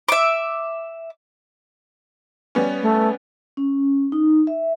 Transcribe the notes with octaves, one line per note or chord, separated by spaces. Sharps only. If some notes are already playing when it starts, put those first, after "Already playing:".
E5 D6
G3 B3 C#4
A3
C#4
D#4
E5